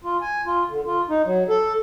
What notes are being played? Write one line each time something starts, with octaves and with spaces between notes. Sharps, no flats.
F4
G#5
F4
D3
F4
D#4
F#3
A4